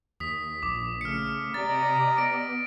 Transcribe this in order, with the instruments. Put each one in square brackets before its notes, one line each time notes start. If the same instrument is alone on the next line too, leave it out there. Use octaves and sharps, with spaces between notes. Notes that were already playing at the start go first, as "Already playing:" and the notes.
[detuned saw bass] D#2 [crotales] D#6 B6
[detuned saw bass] A#1 [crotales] D6
[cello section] C#3 A3 [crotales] F6 C#7
[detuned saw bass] C3 [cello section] G4 D5 D#5 [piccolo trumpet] A#5 [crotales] A6
[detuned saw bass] B3 [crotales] A#6 D7